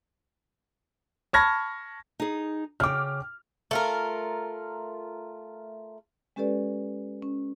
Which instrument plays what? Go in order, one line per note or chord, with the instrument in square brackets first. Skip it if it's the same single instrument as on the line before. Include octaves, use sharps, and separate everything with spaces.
[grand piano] A5 B5 C#6 F6 G#6 A#6
[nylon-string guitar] D#4 G#4
[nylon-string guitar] C#3 G5 [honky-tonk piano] D6 F6
[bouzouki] A3 F4 A#4
[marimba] G#3 C#4 G4 A4 B4 D5
C#4